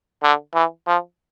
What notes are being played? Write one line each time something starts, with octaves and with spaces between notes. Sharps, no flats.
D3
E3
F3